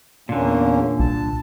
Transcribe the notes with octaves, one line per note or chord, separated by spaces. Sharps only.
E2 A#2 D3 A#3 C#4
C2 A5